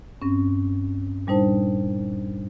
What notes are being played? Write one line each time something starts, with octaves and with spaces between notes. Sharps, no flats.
G2 C4 C#4
A#2 G3 D4 D#4 C5 A5